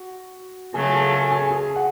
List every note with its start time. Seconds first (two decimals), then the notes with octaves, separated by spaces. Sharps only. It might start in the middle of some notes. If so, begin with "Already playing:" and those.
Already playing: F#4
0.74 C#3 F#3 A3 F4 G#4 G#5
0.93 A4 A5
1.12 G#4 G#5
1.31 G#4 G#5
1.50 G#4 G#5
1.76 F#5